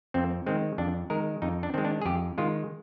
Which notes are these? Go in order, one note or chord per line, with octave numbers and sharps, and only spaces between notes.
F2 C4
D#3 G#3 C4
F2 D4
D#3 G#3 A#4
F2 D#4
D4
D#3 G#3 C4
D4
G#4
F2 G4
D#3 G#3 F4